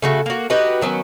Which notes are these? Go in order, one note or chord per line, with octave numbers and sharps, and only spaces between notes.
C#3 A3 F#4
A#3 F#4
D#4 F#4 G4 B4
D#3 F#3 B3 C#4